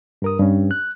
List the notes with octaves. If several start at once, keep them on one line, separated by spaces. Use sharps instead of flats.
G2 A#4 D#6
G2 C#4
F#6